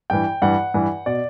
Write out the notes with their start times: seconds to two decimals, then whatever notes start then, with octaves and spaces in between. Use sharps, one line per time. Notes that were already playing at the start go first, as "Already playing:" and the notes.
0.10 G2 E3 G5
0.42 G2 E3 F#5
0.74 G2 E3
1.06 B2 D5